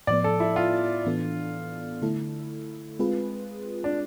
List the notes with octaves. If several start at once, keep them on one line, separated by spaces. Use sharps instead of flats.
A2 F3 B3 D5
A4
E4
F4
A2 E3 B3 D4 A4
D3 A3 E4 A4
G#3 C4 F4 G#4 B4
D4